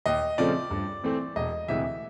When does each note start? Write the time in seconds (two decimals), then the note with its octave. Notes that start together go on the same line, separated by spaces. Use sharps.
0.06 D#2 D#5
0.38 C#3 F3 A3 C4 D5
0.71 G2
1.04 E3 A3 C4
1.36 E1 D#5
1.68 D2 C3 E3 G#3 E5